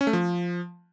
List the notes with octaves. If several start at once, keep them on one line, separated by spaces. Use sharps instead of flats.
C#4
A3
F3